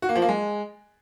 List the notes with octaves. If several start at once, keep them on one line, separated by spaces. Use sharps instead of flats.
F#4
A#3
F3
A#3
G#3